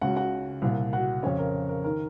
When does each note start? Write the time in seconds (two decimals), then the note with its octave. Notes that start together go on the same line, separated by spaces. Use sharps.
0.01 C#2 C#3 F#4 F#5
0.16 F#4 F#5
0.62 C2 A#2
0.93 F#4 F#5
1.23 F2 C#3 C#4 C#5
1.39 A#4
1.69 A#4
1.84 D#3 A#4